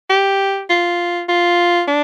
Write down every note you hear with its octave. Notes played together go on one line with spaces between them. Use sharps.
G4
F4
F4
D4